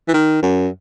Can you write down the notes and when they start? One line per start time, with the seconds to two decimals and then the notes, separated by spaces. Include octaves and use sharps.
0.08 E3
0.14 D#3
0.42 F#2